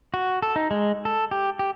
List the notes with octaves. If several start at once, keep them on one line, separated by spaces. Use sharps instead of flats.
F#4
A4
D#4
G#3
A4
G4
G4